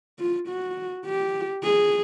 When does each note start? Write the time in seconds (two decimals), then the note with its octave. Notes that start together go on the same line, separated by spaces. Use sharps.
0.19 F4
0.48 F#4
1.06 G4
1.63 G#4